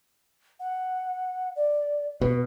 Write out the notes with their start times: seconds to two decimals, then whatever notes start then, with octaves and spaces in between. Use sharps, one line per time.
0.60 F#5
1.56 D5
2.21 B2 B4